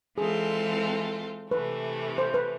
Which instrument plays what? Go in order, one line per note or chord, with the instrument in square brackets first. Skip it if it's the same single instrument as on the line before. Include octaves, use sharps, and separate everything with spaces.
[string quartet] E3 G#3 C4 F4 A4 [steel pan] G#4
[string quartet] C3 E3 A3 [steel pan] B4
[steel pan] C5
B4